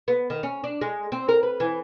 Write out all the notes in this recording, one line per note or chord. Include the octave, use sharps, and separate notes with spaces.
B3
D#3
C#4
D4
G#3
C4
A#4
B4
E3